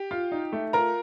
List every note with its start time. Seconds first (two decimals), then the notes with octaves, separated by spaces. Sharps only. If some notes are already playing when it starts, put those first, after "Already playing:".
Already playing: G4
0.11 F4
0.32 D#4
0.53 A3
0.73 F4 A#4 A#5